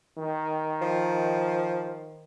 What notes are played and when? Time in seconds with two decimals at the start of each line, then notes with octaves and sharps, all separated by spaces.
0.18 D#3
0.81 F3